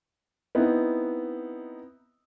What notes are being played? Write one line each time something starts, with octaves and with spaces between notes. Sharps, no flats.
B3 C4 D#4 E4